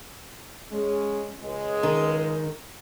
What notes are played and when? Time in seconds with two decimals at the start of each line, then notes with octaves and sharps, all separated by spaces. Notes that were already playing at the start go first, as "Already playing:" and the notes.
0.71 G#3 C#4
1.40 C#2 G#3
1.83 D#3